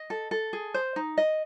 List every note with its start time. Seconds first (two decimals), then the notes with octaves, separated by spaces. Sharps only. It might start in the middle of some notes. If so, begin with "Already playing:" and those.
Already playing: D#5
0.10 A4
0.31 A4
0.53 G#4
0.74 C5
0.96 D#4
1.18 D#5